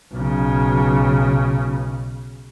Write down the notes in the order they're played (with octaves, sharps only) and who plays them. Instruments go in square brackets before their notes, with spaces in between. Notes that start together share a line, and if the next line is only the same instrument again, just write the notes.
[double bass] B1 C#3